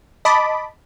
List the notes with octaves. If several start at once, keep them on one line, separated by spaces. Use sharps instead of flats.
D#5 A5 B5 D6